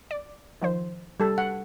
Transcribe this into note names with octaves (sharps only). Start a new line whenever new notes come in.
D5
D#3 F3 C5
G3 A4
F#5